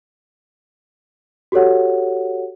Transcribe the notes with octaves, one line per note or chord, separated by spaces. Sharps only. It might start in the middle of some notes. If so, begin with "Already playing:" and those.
F#4 G4 A4 C#5 F#5